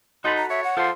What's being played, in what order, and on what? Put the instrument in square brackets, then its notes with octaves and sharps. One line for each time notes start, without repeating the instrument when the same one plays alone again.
[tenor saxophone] D#4 [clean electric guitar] F#4 A4 B5 [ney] C6
[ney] A#5
[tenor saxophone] C#5 [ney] E5
[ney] F#5
[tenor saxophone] F3 [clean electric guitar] A4 C5